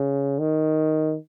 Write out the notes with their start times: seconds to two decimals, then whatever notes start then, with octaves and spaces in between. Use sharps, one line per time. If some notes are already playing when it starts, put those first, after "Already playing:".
Already playing: C#3
0.39 D#3